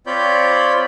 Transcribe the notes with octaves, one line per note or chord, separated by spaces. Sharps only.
C4 F4 C#5 D5 B5 G6